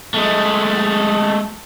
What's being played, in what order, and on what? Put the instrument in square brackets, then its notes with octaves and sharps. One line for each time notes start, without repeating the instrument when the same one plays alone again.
[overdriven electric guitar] G#3 A3